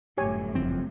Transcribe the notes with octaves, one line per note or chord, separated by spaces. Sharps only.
G1 F#2 A2 G4 C#5 G#5
F#1 F2 C4